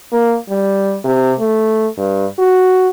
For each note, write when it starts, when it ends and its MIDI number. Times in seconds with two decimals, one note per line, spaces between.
0.13 0.36 58
0.49 0.97 55
1.05 1.33 48
1.40 1.87 57
1.98 2.26 43
2.39 2.89 66